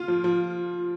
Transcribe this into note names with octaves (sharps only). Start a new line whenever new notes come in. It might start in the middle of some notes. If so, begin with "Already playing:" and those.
Already playing: F4
F3
F3